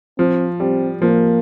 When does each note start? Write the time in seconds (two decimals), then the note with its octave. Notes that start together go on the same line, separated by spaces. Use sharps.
0.18 F3 C4
0.60 G3 C4
1.02 F3 A#3